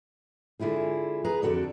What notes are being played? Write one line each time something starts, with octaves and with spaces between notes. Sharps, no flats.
D3 G#3 E4 F4 G#4
G#4 B4 A#5
F2 D3 F#4 A4 D5